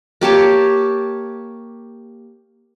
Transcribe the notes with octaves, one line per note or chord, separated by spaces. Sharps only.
A#3 G4 C#5 A5